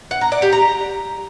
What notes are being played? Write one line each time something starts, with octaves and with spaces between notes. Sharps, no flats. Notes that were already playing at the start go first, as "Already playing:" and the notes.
F#5
A#5
D5
G4
A#5